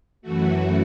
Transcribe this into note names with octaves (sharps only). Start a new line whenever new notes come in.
F#2 E3 A3 F#4